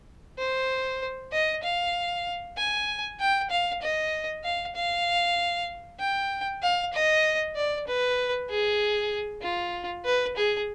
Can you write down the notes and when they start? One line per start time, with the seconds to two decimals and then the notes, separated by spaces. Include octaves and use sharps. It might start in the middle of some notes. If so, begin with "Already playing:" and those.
0.38 C5
1.33 D#5
1.64 F5
2.57 G#5
3.20 G5
3.50 F5
3.82 D#5
4.44 F5
4.75 F5
6.00 G5
6.62 F5
6.93 D#5
7.56 D5
7.87 B4
8.49 G#4
9.42 F4
10.05 B4
10.36 G#4